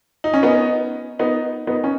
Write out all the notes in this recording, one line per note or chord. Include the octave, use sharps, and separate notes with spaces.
D#4
C#4
B3 D#4
B3 D#4
B3 D#4
C#4